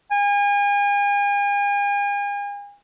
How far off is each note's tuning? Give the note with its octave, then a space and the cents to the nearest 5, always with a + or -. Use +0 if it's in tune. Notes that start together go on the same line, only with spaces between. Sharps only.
G#5 -40